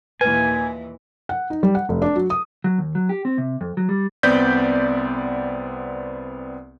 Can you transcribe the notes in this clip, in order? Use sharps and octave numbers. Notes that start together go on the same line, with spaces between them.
D#2 A#2 E3 B4 G#5
F#5
D#4
G3
F#5
F1
D4
F#3
D#6
F#3
D#2
F#3
G4
C4
C3
F2
F#3
G3
C2 B3 C4 D5 G6 B6